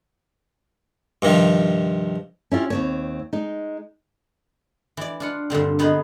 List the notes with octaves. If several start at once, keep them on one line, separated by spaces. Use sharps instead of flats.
G2 C3 D#3 F3
C#4 E4 F4 G4
D#2 C4 C#5
G#3 D#4
E3 D5
D4 F4 F#5
G2 A#2 D3 C4
D3 B3 D#4 G#4 B4 B5